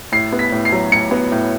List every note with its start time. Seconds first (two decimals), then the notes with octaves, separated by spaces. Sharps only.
0.12 A2 C7
0.32 B3
0.39 B6
0.52 A2
0.65 C7
0.72 F#3
0.92 A2 C#7
1.11 B3
1.32 A2